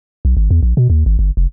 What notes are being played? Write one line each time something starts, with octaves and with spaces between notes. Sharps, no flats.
B1
G#1
E2
A#1
B2
D#2
G#1
G1
F1